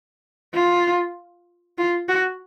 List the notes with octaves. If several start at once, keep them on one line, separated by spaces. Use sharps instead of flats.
F4
F4
F#4